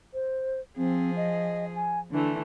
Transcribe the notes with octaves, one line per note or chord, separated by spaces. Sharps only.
C5
F3 C4 G#4
D#5
G#5
D3 E3 A3 D4